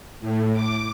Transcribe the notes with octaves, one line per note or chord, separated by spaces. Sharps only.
A2
D6